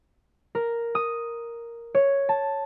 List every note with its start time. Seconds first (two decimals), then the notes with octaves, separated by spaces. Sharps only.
0.55 A#4
0.95 D#6
1.95 C#5
2.29 A5